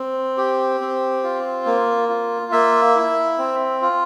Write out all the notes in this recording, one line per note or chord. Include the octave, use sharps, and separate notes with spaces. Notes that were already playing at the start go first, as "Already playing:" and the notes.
Already playing: C4
G4
C4
F4
A#3
F4
A#3 E5
E4
C4
F4